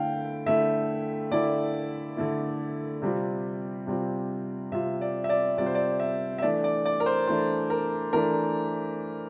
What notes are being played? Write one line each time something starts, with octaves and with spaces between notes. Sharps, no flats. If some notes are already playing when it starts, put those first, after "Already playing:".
Already playing: D3 A3 E4 F5 G5
D3 A3 E4 E5
D3 A3 E4 D5
D3 A3 E4
C3 G3 C4 F4
C3 G3 C4 F4
C3 G3 C4 F4 E5
D5
E5
D5
C3 G3 C4 F4 D5
C5
D5
E5
E5
E3 A3 D4 D5
D5
D5
A#4
C5
E3 A3 D4 C5
A#4
E3 A3 D4 A#4